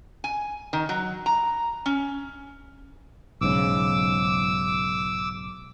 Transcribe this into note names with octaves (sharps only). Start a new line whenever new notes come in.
G#5
D#3
F#3
A#5
C#4
B1 G#2 C#3 D6 E6